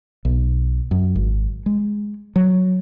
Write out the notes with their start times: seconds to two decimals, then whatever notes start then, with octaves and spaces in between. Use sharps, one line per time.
0.25 B1
0.91 F#2
1.16 G#1
1.66 G#3
2.36 F#3